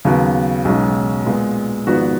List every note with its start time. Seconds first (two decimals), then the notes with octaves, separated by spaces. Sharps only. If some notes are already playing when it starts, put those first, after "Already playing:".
0.05 D#2 C#3 F#3 B3
0.65 B1 B2 G#3 C#4 F#4
1.26 A#2 G#3 B3
1.87 G#1 G#2 F3 B3 F#4